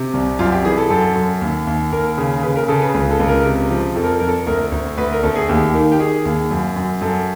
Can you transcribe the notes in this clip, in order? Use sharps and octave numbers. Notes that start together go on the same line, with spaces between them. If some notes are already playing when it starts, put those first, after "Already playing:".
Already playing: C3
C2
F#2 F4
G4
E3 G#4
A4
F#2 A4
F#2
D#2
D#2
D#2 A#4
C#3
C#3 B4
A#4
C#3 A4
B4
C#2
A4
C#2
A#4
C3
F3
F2 A4
A#4
A4
F2 A#4
A4
D2 A#4
D2
D2 B4
A#4
D2 A4
G#4
D#2 G4
D#3
G4
D#3 G#4
D#2
F#2
F#2
F#2 A4